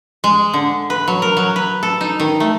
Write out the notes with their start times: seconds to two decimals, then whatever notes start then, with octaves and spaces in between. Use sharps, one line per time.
0.24 G#3
0.54 D3
0.90 B4
1.08 F#3
1.22 A#4
1.37 F#3
1.56 B4
1.83 A4
2.01 D#4
2.20 D#3
2.40 A3